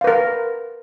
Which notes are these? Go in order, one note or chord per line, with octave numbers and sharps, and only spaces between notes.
A#4 B4 F5